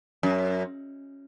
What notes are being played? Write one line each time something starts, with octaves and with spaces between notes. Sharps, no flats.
F#2